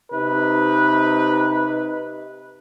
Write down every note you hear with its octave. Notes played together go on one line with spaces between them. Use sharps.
C3 D#4 B4